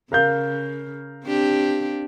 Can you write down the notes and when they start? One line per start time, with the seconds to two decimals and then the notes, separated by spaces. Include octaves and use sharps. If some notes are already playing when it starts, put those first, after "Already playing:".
0.12 C#3 A#4 F5 G6
1.25 C4 D4 G4